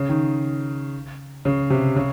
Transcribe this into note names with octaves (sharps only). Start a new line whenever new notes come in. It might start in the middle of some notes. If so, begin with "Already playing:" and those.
Already playing: C#3
D#3
C#3
C3
C#3